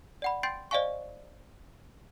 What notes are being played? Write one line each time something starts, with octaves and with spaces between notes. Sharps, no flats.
D5 F#5 B5
G5 C6 G6 A6 C7 D7
C5 D5 D#5 F5 G#5 C#6